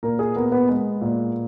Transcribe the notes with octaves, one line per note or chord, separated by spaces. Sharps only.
A#2 A#4
G#4
B3 A#4
B3 B4
G#3
A#2